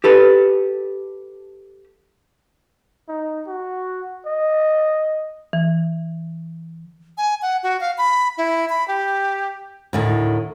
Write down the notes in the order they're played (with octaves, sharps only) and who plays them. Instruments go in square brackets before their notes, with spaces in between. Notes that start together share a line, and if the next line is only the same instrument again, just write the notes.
[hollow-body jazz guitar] G4 A4 B4
[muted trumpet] D#4
F#4
D#5
[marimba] E3
[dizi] G#5
F#5
F#4
F5
B5
E4
B5
G4
[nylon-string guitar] D2 A2 D#3